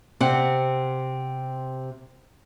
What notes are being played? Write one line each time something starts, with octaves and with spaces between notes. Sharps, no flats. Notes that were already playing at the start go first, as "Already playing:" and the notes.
C3 C4 F#5